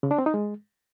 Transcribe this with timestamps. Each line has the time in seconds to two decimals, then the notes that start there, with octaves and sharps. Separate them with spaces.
0.03 C#3
0.11 D4
0.19 C4
0.26 D#4
0.34 G#3